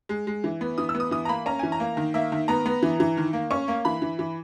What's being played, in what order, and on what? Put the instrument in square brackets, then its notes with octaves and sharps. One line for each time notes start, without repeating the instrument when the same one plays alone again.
[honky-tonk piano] G#3
G#3
E3
B3
E3 D#6
E6
B3
D#6
E3 D#6
A#5
A#3 B5
C#4 A#5
E3 G#5
A#5
A#3
D#3
A#3 E5
D#3
B3 A#5
B3
E3
E3
D#3
A#3
C#4 C#6
A#3
E3 B5
E3
E3